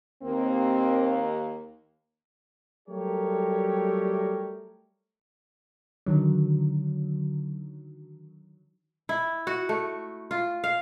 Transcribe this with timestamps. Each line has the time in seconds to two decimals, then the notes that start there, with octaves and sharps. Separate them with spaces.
0.23 D#2 A#3 C4
2.89 F#3 G3 A3 G4 A#4 C#5
6.06 D3 D#3 F#3
9.09 E4
9.47 F#4
9.69 A3
10.31 F4
10.64 F5